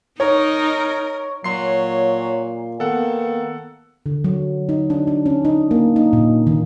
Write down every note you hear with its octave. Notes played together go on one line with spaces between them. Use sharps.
D#4 A#4 C#5
A#2 F#3 C#5 C6 C7
D#3 A#3 B3 A4 F#5
D3
F#3
D#4
D4
D4
C#4
D#4
A#3
D#4
A#2
D#3